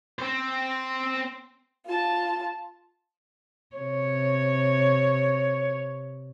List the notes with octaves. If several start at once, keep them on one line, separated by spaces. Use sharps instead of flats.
C4 C5
F4 A5
C3 C#5